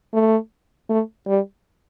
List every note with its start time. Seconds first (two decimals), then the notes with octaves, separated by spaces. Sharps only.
0.14 A3
0.90 A3
1.28 G3